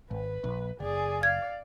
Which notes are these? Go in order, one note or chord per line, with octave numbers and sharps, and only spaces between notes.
G#1 B4
A#1
F#1 G#4 D5
D5 F5 G#6